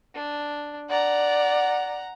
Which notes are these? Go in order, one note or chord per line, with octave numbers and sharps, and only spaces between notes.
D4
D5 F#5 A#5